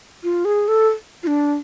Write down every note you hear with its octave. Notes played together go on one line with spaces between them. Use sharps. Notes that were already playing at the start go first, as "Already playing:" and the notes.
F4
G#4
A4
F4
D4